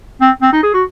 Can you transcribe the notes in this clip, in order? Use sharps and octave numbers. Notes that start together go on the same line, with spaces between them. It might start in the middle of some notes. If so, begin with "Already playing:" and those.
C4
C4
D#4
G#4
F#4